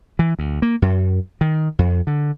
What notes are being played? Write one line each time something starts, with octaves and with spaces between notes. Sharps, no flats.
E3
D2
A#3
F#2
D#3
F2
D3